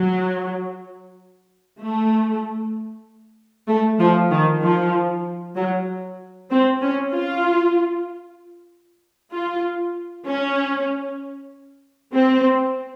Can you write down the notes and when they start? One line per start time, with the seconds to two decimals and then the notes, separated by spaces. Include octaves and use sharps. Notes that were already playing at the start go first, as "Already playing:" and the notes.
Already playing: F#3
1.81 A3
3.68 A3
3.99 F3
4.31 D#3
4.62 F3
5.56 F#3
6.50 C4
6.82 C#4
7.12 F4
9.32 F4
10.26 C#4
12.14 C4